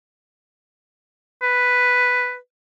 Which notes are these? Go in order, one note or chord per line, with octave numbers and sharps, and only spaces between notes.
B4